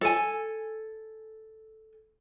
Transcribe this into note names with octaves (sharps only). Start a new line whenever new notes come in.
A4 G#5